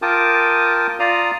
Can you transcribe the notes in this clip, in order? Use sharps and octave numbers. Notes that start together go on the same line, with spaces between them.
F4 A#4 G5 A5 D6 D#6
F4 D5 F5 A#5 D#6